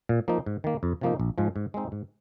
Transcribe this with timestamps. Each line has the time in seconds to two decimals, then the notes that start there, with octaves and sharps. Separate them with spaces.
0.09 A#2
0.28 F3 A#3 D#4
0.46 G#2
0.64 D#3 A#3
0.83 F2
1.01 C3 F3 A#3 D#4
1.20 A#1
1.38 G#2 F3 G#3
1.56 G#2
1.74 G#3 C4 D#4
1.92 G#2